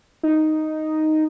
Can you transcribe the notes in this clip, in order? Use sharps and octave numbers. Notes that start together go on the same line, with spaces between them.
D#4